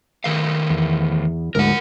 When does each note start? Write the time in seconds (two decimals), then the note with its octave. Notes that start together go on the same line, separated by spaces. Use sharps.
0.24 D#3 A3 F5
0.70 E2
1.55 D2 G#2 A#4 F#5